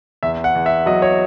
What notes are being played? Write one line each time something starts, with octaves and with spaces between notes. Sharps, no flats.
E2 E5
F#5
E2
E5
F#3 D#5
C#5